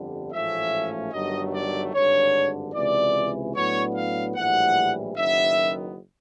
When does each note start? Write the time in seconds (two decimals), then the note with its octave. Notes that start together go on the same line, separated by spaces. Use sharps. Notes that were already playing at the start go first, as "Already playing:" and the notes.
Already playing: G1 F2 D3 G3
0.33 A1 G#2 F3 A3 C#4 E5
1.13 G1 G2 D#3 F#3 A3 D#5
1.54 D5
1.94 G#1 G2 D3 C#5
2.75 C#2 C3 E3 D5
3.55 A2 F#3 B3 D4 C#5
3.95 F5
4.36 A#1 A2 E3 G3 F#5
5.16 F#1 F#2 D#3 F#3 B3 E5